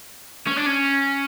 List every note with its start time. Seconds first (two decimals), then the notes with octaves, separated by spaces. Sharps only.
0.47 C#4
0.56 D4
0.66 C#4